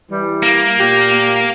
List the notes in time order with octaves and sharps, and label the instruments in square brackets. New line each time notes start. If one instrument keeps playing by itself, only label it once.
[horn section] E3 G3
[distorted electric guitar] A#3
[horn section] A#2 G4